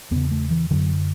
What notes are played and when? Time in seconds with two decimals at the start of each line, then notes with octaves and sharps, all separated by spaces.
0.11 E2 C#3 B3
0.31 A3
0.51 E3
0.71 F#2 D3 F#3